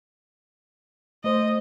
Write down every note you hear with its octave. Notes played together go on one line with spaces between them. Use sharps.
A3 C5 D#5